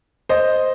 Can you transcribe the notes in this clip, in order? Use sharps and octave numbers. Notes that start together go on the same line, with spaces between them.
C5 D#5